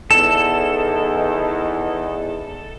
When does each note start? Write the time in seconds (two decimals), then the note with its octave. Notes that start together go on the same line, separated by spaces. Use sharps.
0.11 E2 D#4 A4 E7